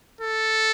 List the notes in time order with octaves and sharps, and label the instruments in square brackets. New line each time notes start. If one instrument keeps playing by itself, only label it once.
[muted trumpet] A4